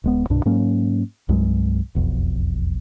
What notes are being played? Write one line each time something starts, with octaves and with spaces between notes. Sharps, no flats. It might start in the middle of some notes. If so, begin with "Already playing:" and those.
D1 G#3 B3
C2 G2 B2 D4
G#2 F#3 A#3 C#4
C2 G2 F#3 G#3
E1 B1 F2